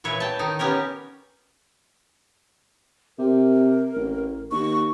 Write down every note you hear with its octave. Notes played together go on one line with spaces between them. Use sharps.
A#2 E3 B4 C#5 E5
G5 A5
D#3 D#4
B3 C#4 G4 A#4
C3 A#4
A1
D#2 C#6